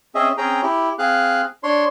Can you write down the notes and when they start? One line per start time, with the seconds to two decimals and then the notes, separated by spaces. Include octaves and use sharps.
0.15 C4 C#4 G#4 D#5 E5
0.37 C4 C#4 G#4 G5 A#5
0.63 E4 G4
0.99 C4 G#4 F5 F#6
1.63 D4 C#5 C6